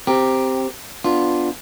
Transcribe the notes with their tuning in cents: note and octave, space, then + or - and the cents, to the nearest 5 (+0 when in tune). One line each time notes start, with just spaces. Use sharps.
C4 +0 G4 +0 A#4 +0
B3 +5 D4 +0 F4 +0